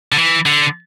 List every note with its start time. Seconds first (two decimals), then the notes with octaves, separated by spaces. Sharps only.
0.12 D3
0.18 E3
0.46 D3